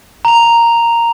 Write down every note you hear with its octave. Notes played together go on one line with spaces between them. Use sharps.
A#5 F7